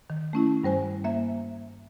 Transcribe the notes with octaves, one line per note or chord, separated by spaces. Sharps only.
D#3
A3 C#4 E4
G2 G3 C5 G#5
A#3 E5